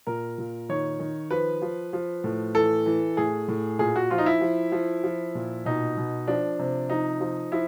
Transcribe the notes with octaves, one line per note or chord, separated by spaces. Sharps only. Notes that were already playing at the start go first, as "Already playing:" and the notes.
A#2 A#4
A#2
D#3 C#5
D#3
F3 B4
F3
F3
A2
E3 A4
E3
A2 G#4
A2
A#2 G#4
F#4
F3 F4
D#4
E4
F3
F3
F3
A#2
B2 D#4
B2
F3 D4
C3
F3 D#4
F3
F3 E4